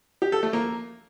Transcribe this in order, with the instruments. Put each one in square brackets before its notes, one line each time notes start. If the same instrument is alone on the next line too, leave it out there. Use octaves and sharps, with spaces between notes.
[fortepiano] G4
A4
A3
A#3